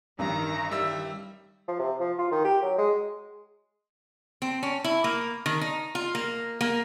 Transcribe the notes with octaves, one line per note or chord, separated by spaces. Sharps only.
A1 G2 D#3 A#5
G3 E5 E6
F3
C3
F3
F4
D#3
G4
F#3
G#3
C4
C#4
E4
A#3
D#3
D#4
F4
A#3
A#3